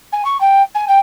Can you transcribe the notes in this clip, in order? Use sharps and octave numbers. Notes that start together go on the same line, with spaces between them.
G#5
C#6
G5
G#5
G5